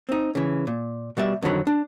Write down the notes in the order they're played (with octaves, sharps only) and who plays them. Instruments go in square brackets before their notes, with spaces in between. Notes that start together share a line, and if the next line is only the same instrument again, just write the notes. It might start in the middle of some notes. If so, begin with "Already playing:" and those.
[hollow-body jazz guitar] C4 D#4
C#3 E3
A#2
B2 G3 D5 E5
F2 D3 D#3 F#3 B5
D4